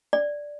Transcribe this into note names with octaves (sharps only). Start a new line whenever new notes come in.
D5